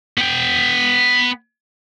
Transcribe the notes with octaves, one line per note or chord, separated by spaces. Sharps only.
B3 G5